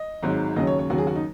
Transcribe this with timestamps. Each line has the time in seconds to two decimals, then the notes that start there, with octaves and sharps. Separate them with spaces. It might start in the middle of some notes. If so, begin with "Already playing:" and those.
Already playing: D#5
0.23 G#1 G#2 F#3
0.56 D#2 C#3 F#3 D#5
0.67 C#5
0.79 C#5
0.90 D#2 C#3 F#3 F#4
0.98 G#4
1.07 F#4
1.16 D#4